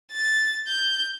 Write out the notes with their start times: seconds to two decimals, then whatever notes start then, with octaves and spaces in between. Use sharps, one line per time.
0.12 A6
0.68 G6